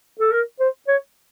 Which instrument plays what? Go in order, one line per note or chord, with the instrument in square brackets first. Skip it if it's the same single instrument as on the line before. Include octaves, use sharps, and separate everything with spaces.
[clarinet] A4
A#4
C5
C#5